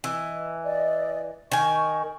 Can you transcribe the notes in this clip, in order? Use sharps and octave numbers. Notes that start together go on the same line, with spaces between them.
E3 D#5
D5 D#5
D#3 G#5 C#6